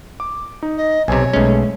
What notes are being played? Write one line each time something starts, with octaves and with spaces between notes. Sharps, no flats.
D6
D#4
D#5
B1 C3 C#5 G#5
B1 G#3 A3 C#4